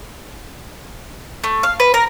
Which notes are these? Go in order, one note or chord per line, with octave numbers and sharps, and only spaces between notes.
A3
F5
B4
A#4